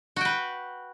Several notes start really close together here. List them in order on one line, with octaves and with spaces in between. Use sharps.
F#4 G5 B4